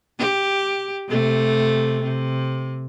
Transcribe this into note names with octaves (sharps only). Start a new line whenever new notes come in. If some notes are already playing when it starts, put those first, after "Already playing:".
G4
C3 A3
C3